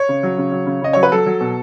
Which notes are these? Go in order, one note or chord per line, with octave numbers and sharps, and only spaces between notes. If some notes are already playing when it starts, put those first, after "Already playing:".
Already playing: C#5
C#3
F#3
C#3
F#3
C#3
C#3 D#5
F#3 C#5
B4
F#3 A4
F#3
B2